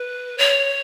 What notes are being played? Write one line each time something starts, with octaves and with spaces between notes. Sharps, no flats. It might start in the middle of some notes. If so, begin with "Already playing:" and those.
Already playing: B4
C#5